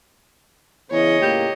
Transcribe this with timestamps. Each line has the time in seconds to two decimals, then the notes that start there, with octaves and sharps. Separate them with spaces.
0.90 E2 C#3 C#5 D#5
1.22 C#2 A2 A#3 G4